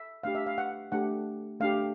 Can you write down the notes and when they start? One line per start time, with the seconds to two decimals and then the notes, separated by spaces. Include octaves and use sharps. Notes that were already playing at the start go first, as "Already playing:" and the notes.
Already playing: E5
0.23 A3 D4 G4 F5
0.35 E5
0.46 F5
0.58 F#5
0.92 A3 D4 G4 F#5
1.60 A3 D4 G4 F5